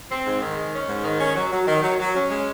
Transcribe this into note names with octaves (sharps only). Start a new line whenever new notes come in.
C4
G#2
D#3
G#3
C#4
G#2
D#3
C#4
F#3
F#3
D#3
F#3
F#3
C#4
G#3